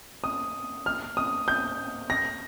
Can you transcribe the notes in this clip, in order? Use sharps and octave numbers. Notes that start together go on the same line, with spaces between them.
D#6
F6
D#6
G6
A#6